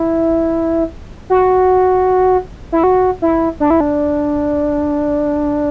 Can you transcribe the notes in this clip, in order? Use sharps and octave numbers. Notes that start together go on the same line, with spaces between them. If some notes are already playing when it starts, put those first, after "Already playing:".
Already playing: E4
F#4
E4
F#4
E4
D4
E4
D4